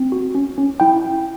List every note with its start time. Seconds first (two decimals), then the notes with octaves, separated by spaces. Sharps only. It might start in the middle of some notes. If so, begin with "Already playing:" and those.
Already playing: C4
0.12 F#4
0.35 C#4
0.58 C#4
0.80 E4 G5